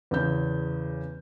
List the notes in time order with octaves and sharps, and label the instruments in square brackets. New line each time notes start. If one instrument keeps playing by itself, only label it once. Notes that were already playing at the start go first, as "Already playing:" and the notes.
[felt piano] E2 C#3 G6